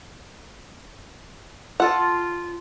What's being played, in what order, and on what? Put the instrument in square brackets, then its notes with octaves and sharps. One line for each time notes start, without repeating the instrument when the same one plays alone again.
[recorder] F4 [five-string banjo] A4 F#5